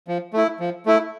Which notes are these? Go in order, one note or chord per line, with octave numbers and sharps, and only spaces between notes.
F3
A3 E4
F3
A3 E4